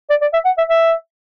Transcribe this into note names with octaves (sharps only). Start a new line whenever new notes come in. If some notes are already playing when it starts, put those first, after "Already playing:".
D5
D5
E5
F#5
E5
E5